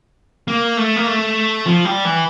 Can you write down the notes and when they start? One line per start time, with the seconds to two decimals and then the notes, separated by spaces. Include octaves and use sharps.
0.48 A#3
0.77 A3
0.96 A#3
1.07 A3
1.66 F3
1.85 G3
2.05 E3